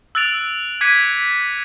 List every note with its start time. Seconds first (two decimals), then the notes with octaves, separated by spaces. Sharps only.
0.15 E6 F#6 A6 D7 F7
0.81 D6 F#6 G#6 B6 C#7 D#7